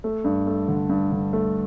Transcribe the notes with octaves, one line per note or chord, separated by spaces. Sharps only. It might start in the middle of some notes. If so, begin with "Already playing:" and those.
A3
G2
A3
D3
G2
D3
A3